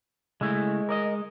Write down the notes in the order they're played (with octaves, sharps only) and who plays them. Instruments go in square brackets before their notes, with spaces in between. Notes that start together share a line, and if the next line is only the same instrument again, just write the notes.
[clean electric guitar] C#3 A3 E4 [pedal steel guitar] G#3
[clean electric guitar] A#4 D5 D#5